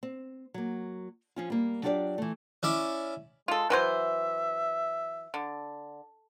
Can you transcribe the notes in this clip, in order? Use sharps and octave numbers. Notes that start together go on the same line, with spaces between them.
C4
F#3 A#3
F3 C#4 F4
G3 A#3
F#3 D4 F4 G4 C#5 D5
E3 A3
C#4 E4 D5
G#3 F4 A4
E3 F#3 C5 E5
D3